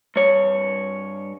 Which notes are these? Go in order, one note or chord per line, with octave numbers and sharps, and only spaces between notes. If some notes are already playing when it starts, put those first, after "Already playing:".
G2 C#5